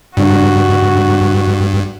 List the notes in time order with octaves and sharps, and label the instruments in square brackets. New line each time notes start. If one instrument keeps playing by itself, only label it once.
[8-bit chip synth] G2 [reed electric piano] C#3 G3 D4 [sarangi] F#4